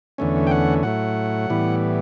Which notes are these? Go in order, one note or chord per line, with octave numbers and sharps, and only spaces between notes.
E2 D3 A3 C#4
G5
F#5
A2 F#3 A3 F#5
A2 E3 G3 B3